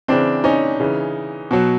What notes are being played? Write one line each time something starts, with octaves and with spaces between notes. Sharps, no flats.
C#3 E3 C4 D4
C#4 D#4
C#3 E3
B2 F#3